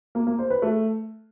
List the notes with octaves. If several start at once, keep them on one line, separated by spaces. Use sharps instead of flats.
A#3
A#3
C5
B4
A3